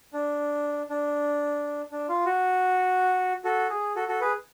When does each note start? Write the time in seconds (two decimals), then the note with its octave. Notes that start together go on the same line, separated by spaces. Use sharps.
0.13 D4
0.90 D4
1.92 D4
2.09 F4
2.26 F#4
3.44 F#4 A4
3.70 G#4
3.96 F#4 A4
4.08 F#4 A4
4.21 G#4 B4